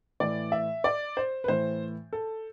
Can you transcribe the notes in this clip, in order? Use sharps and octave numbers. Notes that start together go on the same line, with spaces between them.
A2 E3 D5
E5
D5
C5
B4
A2 E3 C5
A4